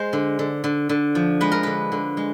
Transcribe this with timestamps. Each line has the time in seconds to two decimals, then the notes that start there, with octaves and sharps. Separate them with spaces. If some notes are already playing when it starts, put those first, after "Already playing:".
Already playing: G#3 C5
0.13 D3
0.39 D3
0.64 D3
0.89 D3
1.15 F3
1.41 G#3 B4
1.52 A#4
1.63 D3 B4
1.92 D3
2.17 G#3